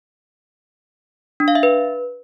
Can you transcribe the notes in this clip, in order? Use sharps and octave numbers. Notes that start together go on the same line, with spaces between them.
D4
F5
E5
B4